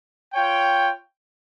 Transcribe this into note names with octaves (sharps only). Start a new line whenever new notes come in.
F4 C#5 G5